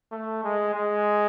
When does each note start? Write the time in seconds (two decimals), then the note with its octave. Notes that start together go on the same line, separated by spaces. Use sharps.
0.12 A3
0.44 G#3
0.75 G#3